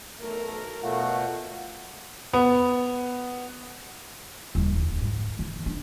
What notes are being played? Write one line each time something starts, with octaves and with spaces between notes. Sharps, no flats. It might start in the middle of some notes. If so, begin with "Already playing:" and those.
B1 A3 A#4
B2 A3 F4 C#5 F5 F#5
B3
D#1
D1
G#2
D#3
D4